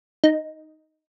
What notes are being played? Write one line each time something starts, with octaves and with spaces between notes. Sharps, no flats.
D#4